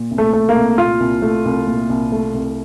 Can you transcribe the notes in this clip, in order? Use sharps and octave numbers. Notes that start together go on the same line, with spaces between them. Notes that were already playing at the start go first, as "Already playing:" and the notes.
Already playing: A#2
C2
A3
A3
A#3
C2
A#2 F4
C2
A3
C2
A#2
C2
A3
C2